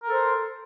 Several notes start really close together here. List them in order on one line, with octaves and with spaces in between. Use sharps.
A#4 A4 C5